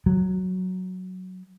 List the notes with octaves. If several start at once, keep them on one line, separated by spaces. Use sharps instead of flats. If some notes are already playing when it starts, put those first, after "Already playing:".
F#3